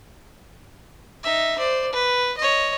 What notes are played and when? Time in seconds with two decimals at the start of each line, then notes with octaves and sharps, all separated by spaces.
1.23 D#4 E5
1.58 C5 D5
1.93 B4
2.38 C#5 D#5